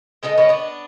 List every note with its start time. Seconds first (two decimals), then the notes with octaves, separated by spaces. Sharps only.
0.23 G#3 B3 A4 D#5
0.38 A#3 B3 C#4
0.49 B3 D4